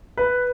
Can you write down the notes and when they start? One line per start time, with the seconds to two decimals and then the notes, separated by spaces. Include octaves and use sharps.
0.17 B4